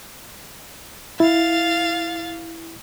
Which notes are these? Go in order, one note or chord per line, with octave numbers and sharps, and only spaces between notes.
E4 F5 A6